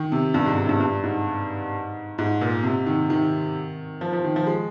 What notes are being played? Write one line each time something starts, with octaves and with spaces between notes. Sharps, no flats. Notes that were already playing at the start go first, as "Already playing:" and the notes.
Already playing: D#3
C3
G2
G#2
G#2
G2
G2
G#2
G#2
A#2
C3
D#3
D#3
F3
F3
D#3
F3
G#3